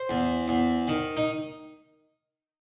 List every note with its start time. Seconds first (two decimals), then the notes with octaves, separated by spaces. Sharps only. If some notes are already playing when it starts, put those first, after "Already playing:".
Already playing: C5
0.09 E2
0.48 E2
0.88 D#3
1.17 D#4